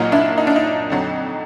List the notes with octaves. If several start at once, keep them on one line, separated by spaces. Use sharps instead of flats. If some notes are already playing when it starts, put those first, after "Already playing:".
Already playing: C2 A#2 F#3 A#3 D#4 F4
D4 E4
D#4
D4
D#4
F2 D3 F#3